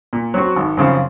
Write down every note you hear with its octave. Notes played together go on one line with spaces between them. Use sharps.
A#2
F#3 C4 F#4
G#1
F#2 C#3 F3 C4